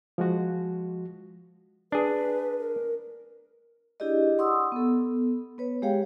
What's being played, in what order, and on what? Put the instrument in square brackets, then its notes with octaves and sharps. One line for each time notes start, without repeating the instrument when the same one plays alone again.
[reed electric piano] F3 G#3 F#4
[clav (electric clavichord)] D4 G#4 [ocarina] B4
[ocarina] A#4
[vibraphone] D4 E4 G4 G#4 D5 D#5
F#5 C6 C#6 D#6 E6
B3 A4
B3 B4 C#5
G#3 G4 G#4 C#5 F5 G5